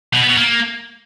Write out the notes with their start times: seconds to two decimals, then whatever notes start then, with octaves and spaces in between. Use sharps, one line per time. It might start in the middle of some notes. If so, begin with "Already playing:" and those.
0.14 B2
0.21 B3
0.29 B2
0.36 A#3